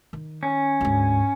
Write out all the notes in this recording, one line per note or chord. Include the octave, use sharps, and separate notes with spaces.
D#3
C#4
D2 G#2